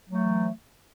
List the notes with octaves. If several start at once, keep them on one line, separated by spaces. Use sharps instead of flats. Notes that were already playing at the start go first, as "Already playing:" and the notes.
E3 F#3 A3